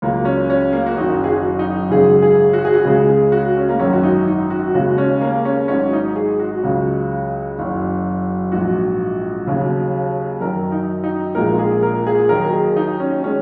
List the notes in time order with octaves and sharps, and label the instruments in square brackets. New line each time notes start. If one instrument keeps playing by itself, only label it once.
[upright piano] C#2 C#3 F#3 A#3
C#4
C#4
A#3
F#4
F#1 F#2 D#3 D#4
G#4
F#4
D#4
G#1 F#2 C#3 G#4
G#4
F#4
G#4
F#4
C#2 C#3 G#3 G#4
G#4
F#4
C#4
A#3
G#1 F#2 D#3 C#4
F#4
D#4
D#4
F#4
D#2 C#3 G#3 F#4
C#4
A#3
C#4
G#1 G#2 F#3 C#4
D#4
G#4
F#4
C#2 C#3 F#3
F#1 F#2 D#3
A#1 G#2 F#3 F#4
D#2 C#3 F#3
F#2 D#3 F#3 A#4
D#4
D#4
A#1 A#2 G#3 A#4
G#4
A#4
G#4
D#2 D#3 F#3 A#4
G#4
D#4
C#4
D#3 G#3 C#4